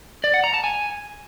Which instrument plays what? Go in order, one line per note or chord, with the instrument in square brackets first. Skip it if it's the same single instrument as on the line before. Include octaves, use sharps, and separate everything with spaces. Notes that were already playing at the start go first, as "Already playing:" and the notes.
[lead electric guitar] D5
F#5
A#5
A5
G#5